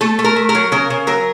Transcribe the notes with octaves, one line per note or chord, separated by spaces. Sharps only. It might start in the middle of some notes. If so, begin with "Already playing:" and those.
A3 A4
A3
A#4
A3
A#4
F#3
C#3 A#4
C#3
F#3 A#4